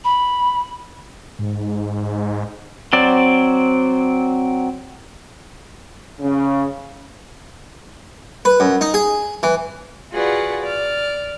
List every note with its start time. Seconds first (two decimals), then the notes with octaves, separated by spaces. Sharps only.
0.04 B5
1.39 G#2
2.93 F#3 C4 D5
6.21 C#3
8.45 B4
8.60 F#2
8.81 D#4
8.94 G#4
9.43 E3
10.13 F4 F#4 G#4 B4 D5 F#5
10.62 D5 F6